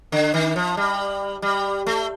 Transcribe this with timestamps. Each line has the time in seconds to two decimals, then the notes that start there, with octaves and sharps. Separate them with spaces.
0.12 D3
0.34 D#3
0.56 F3
0.77 G3
1.42 G3
1.87 A3